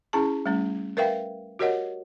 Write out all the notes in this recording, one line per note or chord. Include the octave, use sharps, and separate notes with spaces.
C#4 E4 G#4 A5
G3 A3 C#4
A#4 B4 E5 F5 G5
F#4 G4 A#4 C#5 D#5 F#5